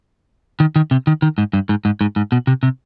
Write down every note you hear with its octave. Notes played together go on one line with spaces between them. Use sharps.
D#3
D#3
C3
D#3
D#3
G#2
G2
G#2
G#2
G#2
G#2
B2
C3
C3